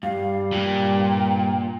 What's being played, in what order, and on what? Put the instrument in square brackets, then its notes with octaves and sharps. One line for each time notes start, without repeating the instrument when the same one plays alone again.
[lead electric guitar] G2 [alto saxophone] G3 [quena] F5
[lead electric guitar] G2 [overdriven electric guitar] A#2 [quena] G5